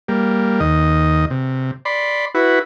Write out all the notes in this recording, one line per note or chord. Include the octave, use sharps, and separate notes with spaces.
G3 A#3
D#2 D#5
C3
D5 B5 C6
E4 F#4 B4